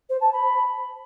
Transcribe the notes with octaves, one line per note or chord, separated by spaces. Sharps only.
C5
A5
B5